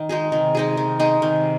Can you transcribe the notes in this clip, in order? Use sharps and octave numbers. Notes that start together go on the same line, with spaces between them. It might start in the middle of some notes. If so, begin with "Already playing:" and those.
Already playing: D#3
G#3 D#4 G#4
C3 D#3
G#3 D#4 G#4
D#3
G#3 D#4 G#4
C3 D#3